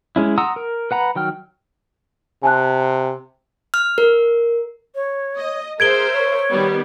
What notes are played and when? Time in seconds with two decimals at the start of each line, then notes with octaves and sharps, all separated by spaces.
0.16 G#3 C#4 E4
0.38 F#5 A#5 C6 D#6 E6
0.56 A#4
0.91 B4 F#5 A#5 B5
1.16 D#3 F#3 G5 F6
2.43 C3 G#5 A5 F#6
3.74 F6
3.98 A#4
4.95 C#5
5.36 D#5
5.80 G#4 A#4 C5 E5 G#6 D7 G7
6.13 C#5
6.50 D#3 G3 B3